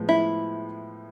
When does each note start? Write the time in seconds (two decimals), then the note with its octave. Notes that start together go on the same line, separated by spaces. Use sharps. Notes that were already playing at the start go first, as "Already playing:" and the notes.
Already playing: A2 F3 G#3 B3
0.09 E4